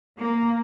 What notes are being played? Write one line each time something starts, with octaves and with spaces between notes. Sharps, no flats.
A#3